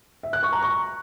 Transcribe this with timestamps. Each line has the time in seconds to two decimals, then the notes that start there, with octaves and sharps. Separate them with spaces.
0.23 E5
0.33 F#6
0.43 C#6
0.53 A#5
0.62 C#6